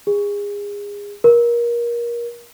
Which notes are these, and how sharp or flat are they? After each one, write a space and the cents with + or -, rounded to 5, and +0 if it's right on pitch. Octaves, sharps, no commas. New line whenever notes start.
G#4 -30
A#4 +25